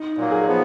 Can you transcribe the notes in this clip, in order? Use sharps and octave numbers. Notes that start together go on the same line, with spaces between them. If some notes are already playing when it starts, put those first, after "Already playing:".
Already playing: D#4
A#2 F#3 A#3
G#4
F3 B3